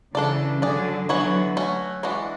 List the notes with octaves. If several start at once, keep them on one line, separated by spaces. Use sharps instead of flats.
C#3 E3 D4 A4 D5
D3 F#3 D4 G#4 D5
D3 E3 F#3 B3 F#4 C#5
A3 C#4 F#4
E3 G#3 D4 F#4